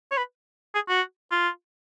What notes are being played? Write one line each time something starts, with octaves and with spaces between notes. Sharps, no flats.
C#5
B4
G#4
F#4
F4